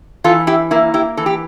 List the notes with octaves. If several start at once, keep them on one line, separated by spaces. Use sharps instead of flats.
E3 F4 A4
E4 G4
A#3 E4
E4 G4
E3 A4
G4